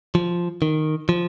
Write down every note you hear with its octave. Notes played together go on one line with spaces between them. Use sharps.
F3
D#3
F3